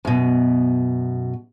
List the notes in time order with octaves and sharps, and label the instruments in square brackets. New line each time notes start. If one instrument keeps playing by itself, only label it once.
[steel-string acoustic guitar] F#2 B2